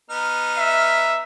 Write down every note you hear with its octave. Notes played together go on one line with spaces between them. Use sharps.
B3 D#4 F6
E5